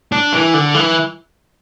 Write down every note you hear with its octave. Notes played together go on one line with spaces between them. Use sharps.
D4
E3
D3
E3